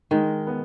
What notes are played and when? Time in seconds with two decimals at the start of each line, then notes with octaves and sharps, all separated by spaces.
0.11 D#3 G#3
0.47 B3